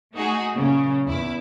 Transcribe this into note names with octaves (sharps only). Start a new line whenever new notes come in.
A3 D#4 F#4 G#4
A#2 C#3 F#3 C#4
E2 E4 D6